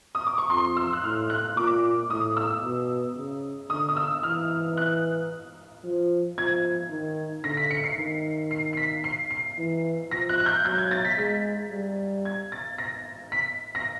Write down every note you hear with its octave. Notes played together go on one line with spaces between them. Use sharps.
D#6
D6
C#6
F2 C6
E6
F#6
A2 F6
F#6
A#2 D6
A2 D#6
E6
B2
C#3
D3 D#6
D#6
E6
E3 F6
F#6
F3
F3 G#6
D#3
D3 A#6
B6
C#7
C7
D#3
C7
C7
B6
C7
C7
E3
F3 A#6
F#6
F#6
G6
F#3 G6
G#6
A6
B6
G#3 B6
G3
G#6
A6
A#6
B6
A#6